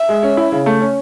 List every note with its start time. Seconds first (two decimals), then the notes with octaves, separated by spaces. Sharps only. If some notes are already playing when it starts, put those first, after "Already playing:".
Already playing: E5
0.09 G#3
0.23 C#4
0.37 E4
0.52 C#3
0.66 A3
0.81 C#4